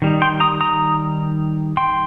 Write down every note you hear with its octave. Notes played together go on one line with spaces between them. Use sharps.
D#3 G3 D#4
G5 C6
A#5 D#6
A#5 D#6
G5 C6